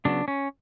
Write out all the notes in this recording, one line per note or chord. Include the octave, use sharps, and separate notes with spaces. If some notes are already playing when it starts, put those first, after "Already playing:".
C#3 F#3 B3 D4
C#4